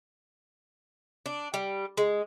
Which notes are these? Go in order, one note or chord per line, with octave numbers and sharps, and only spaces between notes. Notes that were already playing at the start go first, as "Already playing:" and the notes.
D4
G3
G#3